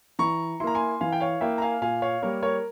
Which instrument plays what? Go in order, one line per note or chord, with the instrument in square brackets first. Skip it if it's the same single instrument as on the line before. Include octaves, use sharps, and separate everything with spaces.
[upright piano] E3 A#5 C#6
E4 C6
A#3 A#5
G#5 C6
E3 F5 G#5
G5
C#5 F5
A#3 E4 E5 G5
A#5
F5 G#5
A#2 F5 G#5
C#5 F5
G3 A#3 A#4 C#5
A#4 C#5